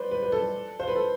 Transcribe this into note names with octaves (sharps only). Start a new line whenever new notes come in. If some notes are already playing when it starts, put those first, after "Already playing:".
Already playing: B4 C5 D5
B4
B4
A4
C5
B4
A4